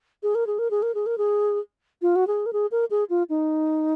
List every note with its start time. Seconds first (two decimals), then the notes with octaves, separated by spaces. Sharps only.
0.23 G#4
0.35 A#4
0.47 G#4
0.59 A#4
0.71 G#4
0.82 A#4
0.94 G#4
1.06 A#4
1.18 G#4
2.02 F4
2.16 F#4
2.27 G#4
2.46 A#4
2.53 G#4
2.71 A#4
2.90 G#4
3.10 F4
3.29 D#4